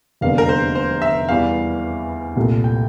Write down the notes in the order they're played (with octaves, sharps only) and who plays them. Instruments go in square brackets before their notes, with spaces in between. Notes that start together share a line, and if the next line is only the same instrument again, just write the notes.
[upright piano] F1 E2 D3 G3 A#3 [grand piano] F5
[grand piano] A#4
C5
C5
E5
[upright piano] E2 E3 G3 [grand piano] F5
[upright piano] C2 A#2 A3
[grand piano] G5